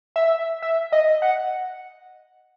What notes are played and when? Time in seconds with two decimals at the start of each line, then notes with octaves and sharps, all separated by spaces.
0.16 E5
0.62 E5
0.92 D#5
1.22 F#5